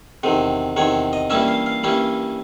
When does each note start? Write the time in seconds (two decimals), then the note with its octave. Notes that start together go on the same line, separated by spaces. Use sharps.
0.23 E2 C3 D#3
0.76 E2 C3 D#3 C#5
1.13 D#5
1.30 G2 E3 G3 A#3 C#4 E5
1.48 F5
1.66 F5
1.83 G2 E3 G3 A#3 C#4